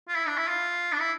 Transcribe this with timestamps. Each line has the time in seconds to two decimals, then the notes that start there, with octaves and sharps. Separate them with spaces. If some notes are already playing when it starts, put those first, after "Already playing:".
0.08 F4
0.17 E4
0.27 D4
0.38 E4
0.48 F4
0.92 D4
1.00 E4